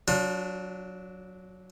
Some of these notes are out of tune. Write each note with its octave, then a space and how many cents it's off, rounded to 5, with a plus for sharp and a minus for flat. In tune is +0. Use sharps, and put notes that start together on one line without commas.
F#3 +0 D4 -15 F4 +40